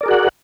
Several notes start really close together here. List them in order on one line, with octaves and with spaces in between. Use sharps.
D5 A#4 G#4 F#4 F#5